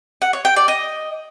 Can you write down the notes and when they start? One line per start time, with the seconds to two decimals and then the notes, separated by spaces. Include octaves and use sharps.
0.22 F#5
0.33 C#5
0.45 G5
0.56 D5
0.68 D#5